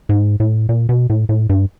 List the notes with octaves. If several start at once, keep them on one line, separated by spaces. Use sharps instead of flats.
G#2
A2
A#2
B2
A2
A2
G2